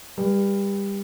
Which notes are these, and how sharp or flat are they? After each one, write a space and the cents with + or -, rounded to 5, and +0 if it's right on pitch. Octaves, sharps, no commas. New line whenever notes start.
G3 +25 B4 -25